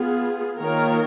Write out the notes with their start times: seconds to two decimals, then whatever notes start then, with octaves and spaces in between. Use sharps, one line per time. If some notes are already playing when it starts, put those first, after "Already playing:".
Already playing: B3 F4 G#4
0.58 D#3 A#3 F4 A#4 C#5